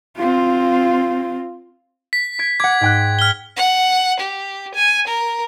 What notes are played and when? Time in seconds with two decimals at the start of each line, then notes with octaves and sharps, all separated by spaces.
0.17 C4 F4
2.13 B6
2.39 G#6 D7
2.60 F#5 D6 G#6
2.81 G#2 G5 F#6
3.19 F6 G7
3.56 F#5
4.20 G4
4.75 G#5
5.08 A#4